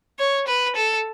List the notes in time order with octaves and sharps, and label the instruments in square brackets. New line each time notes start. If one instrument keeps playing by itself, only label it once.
[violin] C#5
B4
A4